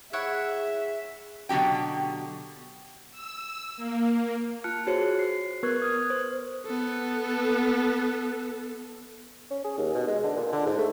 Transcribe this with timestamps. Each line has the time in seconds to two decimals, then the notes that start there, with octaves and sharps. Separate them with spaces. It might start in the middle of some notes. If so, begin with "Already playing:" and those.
0.13 E4 G#4 C#5 E5 F#5
1.49 B2 D3 F#3 G4 G5
3.12 E6
3.77 A#3
4.64 F4 A5 F6 F#6 C#7
4.87 F#4 G#4 C5 C#5 C#7
5.19 C7
5.63 B3 A#4 B4 C#6 F#6 G#6
5.82 D#6 F6 G#6
6.10 C5
6.65 B3 A4
9.51 C#4
9.64 G#4
9.78 D#2
9.95 B2
10.07 G#3
10.24 D3
10.36 A#2
10.53 D3
10.66 G#2
10.78 A3